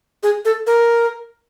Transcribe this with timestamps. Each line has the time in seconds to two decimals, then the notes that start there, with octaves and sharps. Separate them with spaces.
0.23 G#4
0.45 A4
0.67 A#4